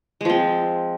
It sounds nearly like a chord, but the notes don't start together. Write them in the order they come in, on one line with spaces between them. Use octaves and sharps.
G#3 F3 C4